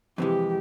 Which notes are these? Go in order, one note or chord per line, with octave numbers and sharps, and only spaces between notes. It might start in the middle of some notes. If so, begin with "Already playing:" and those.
F2 C3 E3 G#3 G4